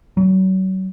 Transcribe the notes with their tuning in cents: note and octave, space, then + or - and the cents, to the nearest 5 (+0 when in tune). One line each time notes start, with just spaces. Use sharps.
F#3 +35